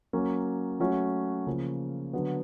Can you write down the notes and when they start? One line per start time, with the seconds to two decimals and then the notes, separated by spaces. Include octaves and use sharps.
0.13 F#3 A#3 C#4
0.80 F#3 A3 C#4 F#4
1.47 C#3 F3 A#3
2.13 D3 F#3 B3